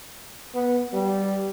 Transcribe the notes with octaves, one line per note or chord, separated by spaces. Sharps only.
B3
G3